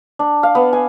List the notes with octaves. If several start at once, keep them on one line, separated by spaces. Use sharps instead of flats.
D4
F5
B3
G#5